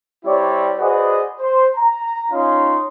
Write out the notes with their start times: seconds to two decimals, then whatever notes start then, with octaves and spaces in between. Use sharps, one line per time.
0.25 G3 C4 E4 G4 C#5 D5
0.79 F#4 G#4 B4 C5 D5 D#5
1.39 C5
1.76 A#5
2.32 C#4 D#4 F4 C#5 F5 C6